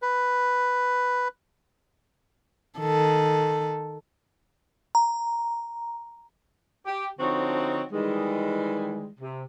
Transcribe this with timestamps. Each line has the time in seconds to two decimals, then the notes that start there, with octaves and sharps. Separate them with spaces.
0.02 B4
2.79 D#3 A4
4.95 A#5
6.86 G4
7.20 D3 F3 C4 D#4 F#4 C#5
7.92 D#3 E3 G3 G#3
9.20 C3